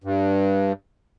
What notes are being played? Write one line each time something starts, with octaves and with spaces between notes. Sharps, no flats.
G2